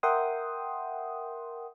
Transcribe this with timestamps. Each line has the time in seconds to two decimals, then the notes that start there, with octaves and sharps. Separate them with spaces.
0.03 A#4 E5 F#5 G5 C6 D#6